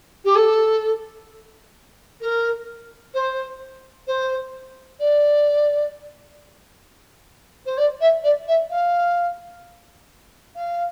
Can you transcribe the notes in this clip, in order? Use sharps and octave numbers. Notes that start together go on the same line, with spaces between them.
G4
A4
A#4
C5
C5
D5
C5
D5
E5
D5
E5
F5
F5